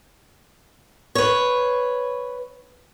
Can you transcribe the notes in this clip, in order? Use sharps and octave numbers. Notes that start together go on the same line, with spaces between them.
B4 C#5